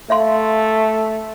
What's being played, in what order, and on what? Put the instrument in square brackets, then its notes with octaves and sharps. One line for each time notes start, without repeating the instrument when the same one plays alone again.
[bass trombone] A3 [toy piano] E5 F5 C6